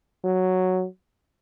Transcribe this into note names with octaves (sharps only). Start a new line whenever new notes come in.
F#3